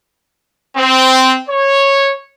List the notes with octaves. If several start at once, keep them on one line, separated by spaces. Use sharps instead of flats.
C4
C#5